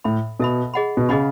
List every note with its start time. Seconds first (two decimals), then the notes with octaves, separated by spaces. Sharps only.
0.04 A2 A4 E5 B5
0.40 B2 A4 E5 B5
0.74 G#4 D#5 F#5 B5
0.97 B2
1.09 C#3 G#4 D#5 F#5 B5